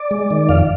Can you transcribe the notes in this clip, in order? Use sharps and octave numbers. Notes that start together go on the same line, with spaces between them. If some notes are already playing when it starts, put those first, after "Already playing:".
Already playing: D5
G#3
D#3
F2 F5